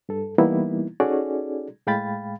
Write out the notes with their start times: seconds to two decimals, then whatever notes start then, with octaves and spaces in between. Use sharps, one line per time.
0.09 G2 A4
0.38 E3 G3 A#3 B3 D#4 E4
1.00 C#4 D#4 F#4 G#4 A4 D5
1.87 A2 G#3 F5 G5 B5 A6